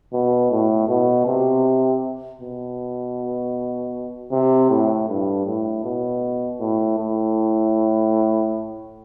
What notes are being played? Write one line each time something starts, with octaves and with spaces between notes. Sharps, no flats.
B2
A2
B2
C3
B2
C3
A2
G2
A2
B2
A2
A2